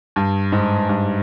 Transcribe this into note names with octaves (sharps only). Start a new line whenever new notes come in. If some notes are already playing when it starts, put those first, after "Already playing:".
G2
G#2
G2